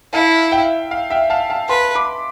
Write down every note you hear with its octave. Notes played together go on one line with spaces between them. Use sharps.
E4 F5 A5
E5 G5
F5
E5 G5
F5 A5
F5 A5
B4 A5 C6
B5 D6